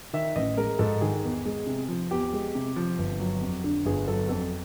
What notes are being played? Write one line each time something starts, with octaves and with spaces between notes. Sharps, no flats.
D#3 E5
A1 D#5
G#3 A#4
G#2 A4
D#3 G#4
E2
G#3
C3
F3
E2 G4
G#3
C3
F3
G1
F#3
F2
D3
G1 G#4
F#3 A4
F2 A4